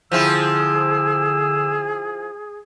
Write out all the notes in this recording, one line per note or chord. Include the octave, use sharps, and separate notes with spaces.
D3 F3 C4 E4 G#4 E6